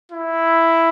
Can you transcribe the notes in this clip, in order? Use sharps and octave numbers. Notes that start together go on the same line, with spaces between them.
E4